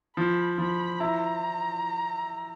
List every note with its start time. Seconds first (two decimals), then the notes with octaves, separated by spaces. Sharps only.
0.17 F3 B5
0.58 F3 B5
1.00 E4 A#5